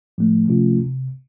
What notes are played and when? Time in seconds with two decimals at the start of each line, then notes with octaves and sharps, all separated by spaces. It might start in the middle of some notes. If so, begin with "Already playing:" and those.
0.18 A2 F3 A3
0.48 C3 F3 A3 C#4 F4
0.79 C3